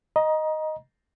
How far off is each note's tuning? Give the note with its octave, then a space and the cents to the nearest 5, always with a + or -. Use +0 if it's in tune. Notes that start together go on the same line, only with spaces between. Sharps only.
D#5 +0 A#5 +25